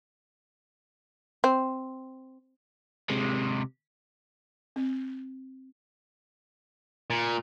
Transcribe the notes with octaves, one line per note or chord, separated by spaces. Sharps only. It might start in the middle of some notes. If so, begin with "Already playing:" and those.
C4
C3 G#3
C4
A#2